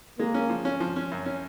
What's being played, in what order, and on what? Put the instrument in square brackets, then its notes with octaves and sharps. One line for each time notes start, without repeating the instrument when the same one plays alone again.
[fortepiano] G#3 [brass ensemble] A#3
[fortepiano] C#4
F3
C#4
F3
C#4
F#2
C#4